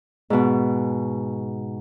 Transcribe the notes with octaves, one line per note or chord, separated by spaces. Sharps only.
G#2 B2